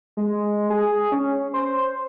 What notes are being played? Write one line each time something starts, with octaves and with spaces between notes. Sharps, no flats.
G#3
G#4
C#4
C5